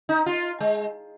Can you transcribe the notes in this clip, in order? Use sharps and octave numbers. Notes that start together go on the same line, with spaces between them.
D#4
F4
G#3